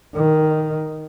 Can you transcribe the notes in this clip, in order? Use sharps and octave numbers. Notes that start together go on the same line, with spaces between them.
D#3